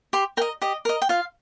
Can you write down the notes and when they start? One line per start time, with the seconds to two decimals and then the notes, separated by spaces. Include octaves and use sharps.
0.13 G4 C6
0.37 A#4 G5
0.41 D#5
0.62 G4 D#5
0.85 A#4 D#5
1.02 G5
1.09 F4 F5